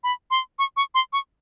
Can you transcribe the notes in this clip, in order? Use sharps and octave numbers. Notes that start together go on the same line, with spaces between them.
B5
C6
C#6
C#6
C6
C#6